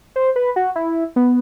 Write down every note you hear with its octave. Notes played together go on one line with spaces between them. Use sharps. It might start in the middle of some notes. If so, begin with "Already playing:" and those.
C5
B4
F#4
E4
B3